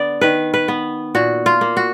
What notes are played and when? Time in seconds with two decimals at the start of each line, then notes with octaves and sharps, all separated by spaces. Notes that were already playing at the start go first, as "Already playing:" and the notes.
Already playing: D3 B3 D5
0.21 D#3 B4
0.54 B4
0.68 B3
1.15 A#2 F#4
1.46 F4
1.61 A#3
1.77 F#4